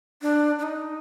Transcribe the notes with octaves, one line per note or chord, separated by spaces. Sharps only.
D4
D4
D#4